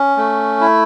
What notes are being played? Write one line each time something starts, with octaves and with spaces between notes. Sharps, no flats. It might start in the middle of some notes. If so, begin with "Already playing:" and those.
Already playing: C#4
A3
E4